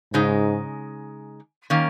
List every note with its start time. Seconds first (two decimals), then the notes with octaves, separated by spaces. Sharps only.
0.14 G#2 C#3 G#3 D#4
1.70 D#3 A#3 C#4